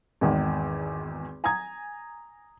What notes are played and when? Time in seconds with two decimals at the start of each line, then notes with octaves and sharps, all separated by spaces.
0.21 G#1 E2 D#3
1.44 G#5 A#5 D#6 G#6